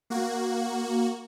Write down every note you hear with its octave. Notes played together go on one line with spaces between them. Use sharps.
A#3 F#4